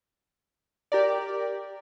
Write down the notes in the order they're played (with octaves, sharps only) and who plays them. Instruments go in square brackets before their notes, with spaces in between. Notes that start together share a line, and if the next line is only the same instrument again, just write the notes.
[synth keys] G4 A#4 D5